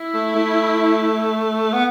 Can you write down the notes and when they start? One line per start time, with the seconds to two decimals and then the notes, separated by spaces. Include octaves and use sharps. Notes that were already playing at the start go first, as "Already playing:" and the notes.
Already playing: E4
0.14 A3
0.35 A3
1.73 B3